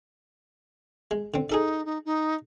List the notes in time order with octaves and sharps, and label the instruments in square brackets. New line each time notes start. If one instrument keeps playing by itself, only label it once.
[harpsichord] G#3
D3 C4
[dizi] D#4 [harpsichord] G#4 A4 D5
[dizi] D#4
D#4